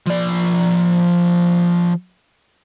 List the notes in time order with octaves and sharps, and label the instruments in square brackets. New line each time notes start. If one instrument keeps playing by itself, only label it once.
[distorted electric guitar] F3 D5